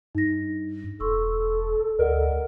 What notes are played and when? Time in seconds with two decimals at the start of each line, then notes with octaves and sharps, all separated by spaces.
0.15 G2 D#4 A#6
1.00 E1 A4 C6 C#6 E6
1.99 D2 A#4 D5 D#5 F#5